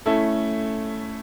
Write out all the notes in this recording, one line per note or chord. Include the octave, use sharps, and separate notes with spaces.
A3 C#4 E4 A4